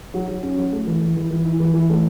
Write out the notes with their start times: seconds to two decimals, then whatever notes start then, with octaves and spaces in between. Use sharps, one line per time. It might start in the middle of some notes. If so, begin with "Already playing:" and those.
0.14 F#3
0.28 F#3
0.43 C#4
0.57 F#3
0.72 A3
0.87 E3
1.01 E3
1.16 E3
1.30 E3
1.45 E4
1.60 E3
1.74 E3
1.89 A3